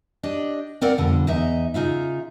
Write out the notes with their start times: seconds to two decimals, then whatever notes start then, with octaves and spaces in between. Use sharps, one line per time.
0.23 D4 G4 D#5
0.81 C4 A#4 D5 F5 F#5
0.98 F2 B2 D3 G3
1.27 E2 D#4 D#5 E5
1.74 C#3 D#4 F4 E5